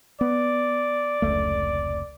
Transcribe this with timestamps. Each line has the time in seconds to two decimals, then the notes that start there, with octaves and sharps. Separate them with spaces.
0.21 B3 D5
1.22 F1 C#2 A3